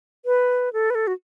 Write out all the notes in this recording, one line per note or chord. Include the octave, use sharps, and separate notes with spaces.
B4
A4
B4
A4
F#4